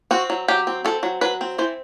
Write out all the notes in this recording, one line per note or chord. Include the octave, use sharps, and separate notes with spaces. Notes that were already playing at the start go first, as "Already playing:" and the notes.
C4 F#4
F#3
F#3 G4
C4
C4 A4
F#3
F#3 B4
C4
E3 C5